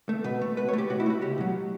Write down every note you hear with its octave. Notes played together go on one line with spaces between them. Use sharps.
A3
B2 B4
A3
B2 B4
C#5
A3 G4
B2 F#4
E4
A3 F#4
C#2 G4
B2 F#3